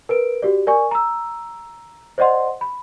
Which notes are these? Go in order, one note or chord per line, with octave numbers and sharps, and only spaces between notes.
A#4 B4 D7
F#4 G4 D5
A#4 D5 G#5 C#6
A#5 E6
C5 D5 D#5 F#5 C6
B5